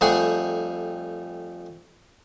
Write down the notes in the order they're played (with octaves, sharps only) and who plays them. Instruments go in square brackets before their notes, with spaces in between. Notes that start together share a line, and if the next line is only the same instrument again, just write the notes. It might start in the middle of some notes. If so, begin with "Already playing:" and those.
[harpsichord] F2 G3 A3 G#4 F#5 G#5